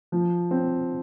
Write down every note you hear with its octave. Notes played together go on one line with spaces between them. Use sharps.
F3
C4